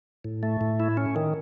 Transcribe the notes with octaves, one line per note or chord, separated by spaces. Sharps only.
A2
A3
A2
E4
C#4
D#3